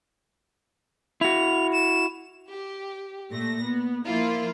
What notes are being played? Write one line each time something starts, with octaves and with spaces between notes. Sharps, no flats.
E4 F#4 F7
E7
G4
A#2 A3 A#6
B3
F3 A#3 E4 F4